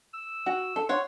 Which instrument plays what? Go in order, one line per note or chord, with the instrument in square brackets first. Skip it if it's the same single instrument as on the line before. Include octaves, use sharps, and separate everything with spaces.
[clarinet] E6
[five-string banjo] F#4
A4
[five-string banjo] C#5 F#5 [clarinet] C6